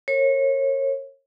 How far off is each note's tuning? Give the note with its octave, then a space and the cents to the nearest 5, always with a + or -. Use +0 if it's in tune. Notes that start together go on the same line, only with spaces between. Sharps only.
A#4 -20 C#5 -30